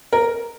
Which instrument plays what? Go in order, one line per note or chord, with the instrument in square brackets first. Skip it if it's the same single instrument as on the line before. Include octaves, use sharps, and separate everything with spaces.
[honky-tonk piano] A#4